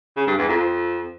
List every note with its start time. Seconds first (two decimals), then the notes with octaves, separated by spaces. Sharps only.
0.17 C#3
0.27 G2
0.38 E2
0.49 F2